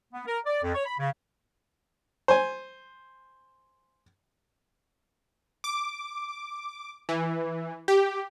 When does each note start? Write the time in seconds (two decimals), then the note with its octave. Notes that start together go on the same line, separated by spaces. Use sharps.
0.13 B3
0.27 A#4
0.46 D5
0.62 F2
0.74 C#5
0.86 B5
0.99 C#3
2.28 C5 G#5
5.64 D6
7.09 E3
7.88 G4